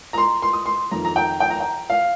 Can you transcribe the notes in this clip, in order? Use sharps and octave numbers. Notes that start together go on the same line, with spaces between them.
A#5
C6
C6
D#6
C6
F2 D#3 A#5
A#5
G5
G5
A#5
G5
F5